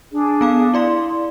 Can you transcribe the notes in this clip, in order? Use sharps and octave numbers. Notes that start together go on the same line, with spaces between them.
D4 G#4
B3 F5 D6
E4 D5 F5 C6